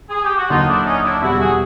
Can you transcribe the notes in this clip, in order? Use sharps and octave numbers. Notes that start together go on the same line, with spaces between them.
G#4
G4
F#4
D#2 D3 F#3 D#4 F4
D4 E4
C#4 D#4
D4 E4
E2 B2 G3 E4 F#4
F#4 G#4